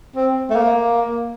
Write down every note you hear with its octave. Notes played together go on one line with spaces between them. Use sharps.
C4
A3
A#3